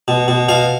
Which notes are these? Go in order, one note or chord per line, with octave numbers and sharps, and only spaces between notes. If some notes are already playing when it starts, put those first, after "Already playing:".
B2
B2
B2 F5